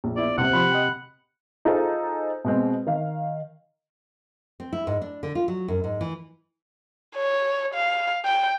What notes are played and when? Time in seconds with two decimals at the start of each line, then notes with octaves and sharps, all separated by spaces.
0.04 A#1
0.16 B3 E4 D5
0.38 D#1 C3 C4 F#5
0.53 F3 B5 C6
0.71 D#5 G5
1.65 D#4 F4 G#4 A4 C5
2.44 B2 G#3 C4
2.87 D#3 F5
4.60 C4
4.73 E4
4.87 G#2
5.02 D4
5.23 D3
5.35 F4
5.48 F#3
5.68 F#2
5.84 G#2
6.01 E3
7.15 C#5
7.74 F5
8.25 G5